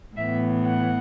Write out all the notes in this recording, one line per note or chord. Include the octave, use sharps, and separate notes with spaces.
A2 E3 B3 E5
F#5